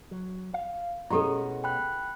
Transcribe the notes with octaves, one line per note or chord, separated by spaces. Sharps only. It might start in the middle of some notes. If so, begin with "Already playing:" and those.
F#3
F5
B2 G#3 C#4 E4 G4 A4
G5 B5 F#6